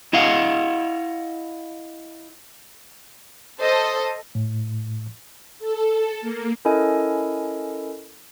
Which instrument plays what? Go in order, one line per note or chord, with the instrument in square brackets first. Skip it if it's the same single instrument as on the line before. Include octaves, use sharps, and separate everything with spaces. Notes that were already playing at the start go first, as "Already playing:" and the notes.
[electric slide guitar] E4 D#5 F5 F#5
[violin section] A4 C5 D#5
[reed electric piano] A2
[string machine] A4
A#3
[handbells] C#4 E4 A4 A#4 D#5 G#5